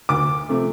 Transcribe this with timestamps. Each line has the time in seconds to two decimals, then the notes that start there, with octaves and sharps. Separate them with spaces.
0.09 D2 D6
0.49 C3 F3 A3